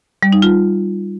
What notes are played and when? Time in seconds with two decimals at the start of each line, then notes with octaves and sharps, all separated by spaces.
0.23 G3
0.32 D#4
0.42 F4